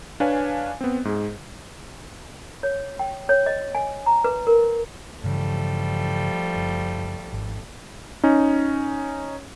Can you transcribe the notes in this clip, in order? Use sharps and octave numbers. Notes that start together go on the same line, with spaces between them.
D4 B4 C#5 F5 G#5
B3 C4
G#2 G#4
C#5
G5
C#5
D#5
G#5
A#5
B4
A#4
G2 C#3 E3 F3 G3 A3
F#1
G#1
C#4 D#4